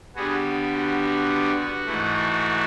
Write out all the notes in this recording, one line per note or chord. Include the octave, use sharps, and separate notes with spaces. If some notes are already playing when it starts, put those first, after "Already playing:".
D3 G3 B3 F#4 G#4
F#4
F#4
G#2 E3 A3